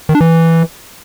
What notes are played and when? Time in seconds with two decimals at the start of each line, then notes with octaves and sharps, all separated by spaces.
0.09 D#3
0.15 D4
0.21 E3